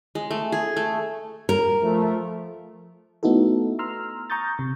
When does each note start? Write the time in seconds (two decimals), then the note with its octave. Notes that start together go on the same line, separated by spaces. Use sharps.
0.15 G#3
0.31 A3
0.52 G#4
0.77 A3
1.49 A#4
1.83 F3 A3
3.23 A3 B3 D#4 E4 F#4 A4
3.79 A#5 C6 E6 F6
4.30 A#5 C#6 D#6 G6 A6
4.59 C3